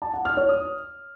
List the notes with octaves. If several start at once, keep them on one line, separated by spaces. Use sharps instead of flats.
A5
F#5
F6
C#5
D#6